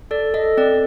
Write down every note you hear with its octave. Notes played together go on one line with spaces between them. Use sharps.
A4 D5
A4 D#5
C4 D5